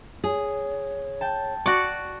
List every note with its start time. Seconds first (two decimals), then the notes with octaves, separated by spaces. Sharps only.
0.24 G#4 C#5
1.21 G5 A5
1.66 F#4 D5 C#6